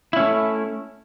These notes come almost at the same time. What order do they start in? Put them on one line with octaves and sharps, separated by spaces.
E4 C#4 A3